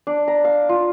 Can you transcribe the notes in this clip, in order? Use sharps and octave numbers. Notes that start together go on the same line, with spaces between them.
D4
A#5
F5
F4